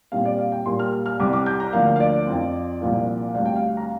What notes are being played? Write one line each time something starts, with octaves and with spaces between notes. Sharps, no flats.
A#2 G3 C4 F5
D5
F5
G5
A#2 G3 A#3 C6
F6
F6
F6
C2 C3 G3 C4 D6
D6
G6
A#5
D2 D3 F3 A#3 F5
F5
D5
F2 F3 C4
C2 A#2 F3 A#3
D2 C3 G3 F5
G5
F5
A#5